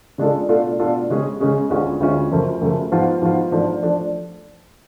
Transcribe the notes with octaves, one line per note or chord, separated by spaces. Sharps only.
C#3 G#3 D4 F4 A4
B2 A3 D4 F4 A4
B2 A3 D4 F4 A4
C#3 G#3 C#4 G#4
C#3 G#3 C#4 G#4
D2 D3 G#3 C#4 F4
D2 D3 G#3 C#4 F4
F#2 C#3 F3 A3
F#2 C#3 F3 A3
G#2 F3 B3 F4
G#2 F3 B3 F4
G#2 F3 A3 D4
F3 A3 D4